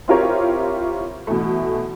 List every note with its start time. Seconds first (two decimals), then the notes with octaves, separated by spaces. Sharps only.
0.08 C4 E4 F4 G4 A#4 C#5
1.27 B2 E3 A3